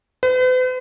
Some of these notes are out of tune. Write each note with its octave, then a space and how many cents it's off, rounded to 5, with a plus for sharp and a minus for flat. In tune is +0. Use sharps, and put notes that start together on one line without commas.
B4 +45